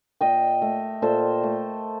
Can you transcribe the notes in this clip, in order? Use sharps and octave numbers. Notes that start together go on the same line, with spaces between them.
A#2 D#5 G5
A3
A#2 A4 C5
A3